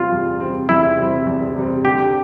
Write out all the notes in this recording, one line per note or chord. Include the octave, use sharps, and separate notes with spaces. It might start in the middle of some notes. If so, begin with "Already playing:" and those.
Already playing: E2 C3 G3 C4 F4
E2
C3 G3 C4
E2 E4
C3 G3 C4
E2
C3 G3 C4
D3 G4